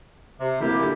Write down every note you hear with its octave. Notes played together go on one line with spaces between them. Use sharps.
C3
D1 C3 A#3 E4 G4
A#2 D3